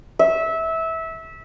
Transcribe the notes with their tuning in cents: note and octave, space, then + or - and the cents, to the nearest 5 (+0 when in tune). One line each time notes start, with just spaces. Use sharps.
E5 -20